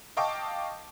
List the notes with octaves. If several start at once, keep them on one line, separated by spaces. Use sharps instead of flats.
D#5 F5 G5 A5 C#6 D6